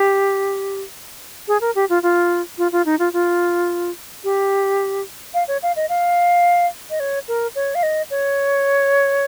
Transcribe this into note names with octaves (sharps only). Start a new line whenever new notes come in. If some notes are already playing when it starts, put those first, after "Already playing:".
Already playing: G4
G#4
A#4
G4
F4
F4
F4
F4
D#4
F4
F4
G4
F5
C#5
F5
D#5
F5
D#5
C#5
A#4
C#5
F5
D#5
C#5